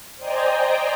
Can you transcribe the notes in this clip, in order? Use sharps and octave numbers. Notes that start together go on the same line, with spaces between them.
C5 D5 D#5 G5 G#5 A#5